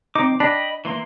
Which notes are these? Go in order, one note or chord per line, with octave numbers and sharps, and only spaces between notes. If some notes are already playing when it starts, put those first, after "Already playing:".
C4 D#4 D6
D4 D#5 G5 B5
E3 A#3 C6